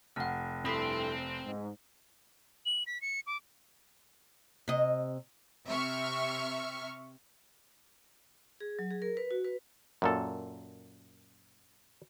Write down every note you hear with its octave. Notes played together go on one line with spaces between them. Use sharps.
F1 F#5 F6
G2 C4 E4 A4 B5 C6 D#6 B6
G#2
F#7
B6
C#7
D6
C3 D#5
C3 E5 C#6 F6
G#4
F#3
G#4
A#4
B4
F#4
B4
F#2 A#2 A4